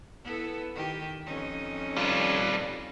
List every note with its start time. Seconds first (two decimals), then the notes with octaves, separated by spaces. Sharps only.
0.24 B3 E4 A4
0.74 D#3 G4
1.25 F2 C#4 D#4
1.96 G3 F4